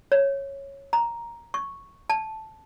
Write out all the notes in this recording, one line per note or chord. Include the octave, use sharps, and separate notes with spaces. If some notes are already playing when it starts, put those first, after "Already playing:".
C#5
A#5
C#6
A5